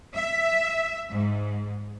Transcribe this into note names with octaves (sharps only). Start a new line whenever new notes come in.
E5
G#2